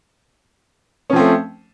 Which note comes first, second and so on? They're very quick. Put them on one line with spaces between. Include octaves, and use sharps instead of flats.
C#4 F3 C4 A3